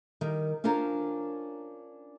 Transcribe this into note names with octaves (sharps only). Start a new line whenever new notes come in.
D#3 G3 A#4
C#4 D4 F4 A#4 C5 C#5